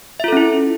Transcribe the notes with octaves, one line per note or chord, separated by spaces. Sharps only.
C#4 E4 F4 A4 E5